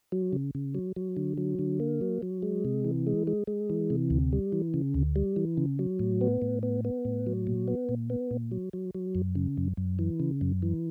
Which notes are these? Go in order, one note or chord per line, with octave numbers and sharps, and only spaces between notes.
F#3
C#3
C#3
F#3
F#3
D3
F#3
D3
A#3
F#3
F#3
G#3
C3
E3
G#3
G#3
G#3
E3
C3
D2
G3
E3
C#3
D2
G3
E3
C#3
F#3
A2
B3
A2
B3
B3
A2
F#3
A#2
B3
A#2
B3
A#2
F#3
F#3
F#3
F#2
C#3
F#2
F#2
E3
C#3
F#2
E3